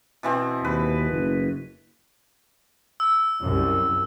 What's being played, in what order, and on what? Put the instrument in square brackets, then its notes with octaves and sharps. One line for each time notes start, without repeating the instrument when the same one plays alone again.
[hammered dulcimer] B2 E3 C4
[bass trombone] D#2 [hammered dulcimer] B4
[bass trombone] F#1
[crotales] E6
[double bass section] C2 F#2